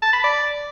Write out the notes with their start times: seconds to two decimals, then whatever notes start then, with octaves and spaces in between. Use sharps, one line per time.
0.02 A5
0.13 B5
0.24 D5